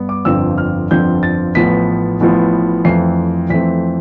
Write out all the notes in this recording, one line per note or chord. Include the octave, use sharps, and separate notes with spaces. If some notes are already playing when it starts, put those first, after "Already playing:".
Already playing: G2 B3
D6
G1 F2 D3 F3 C4 E6
F6
G1 F2 D3 F3 C4 G6
A6
A1 A2 F3 B3 B6
A1 A2 F3 B3
F2 E3 A3 C4 C7
F2 E3 A3 C4 B6